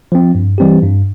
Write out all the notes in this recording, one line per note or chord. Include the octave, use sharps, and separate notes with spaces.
F3 C4
G2
E3 G3 C4 G4
G2